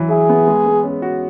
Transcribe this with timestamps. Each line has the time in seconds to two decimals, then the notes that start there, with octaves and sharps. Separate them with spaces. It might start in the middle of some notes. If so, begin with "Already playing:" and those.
Already playing: E3 F#3 E4
0.10 E4 G#4
0.29 B3
0.47 G#3
0.66 G#3
0.83 C#4
1.02 F#4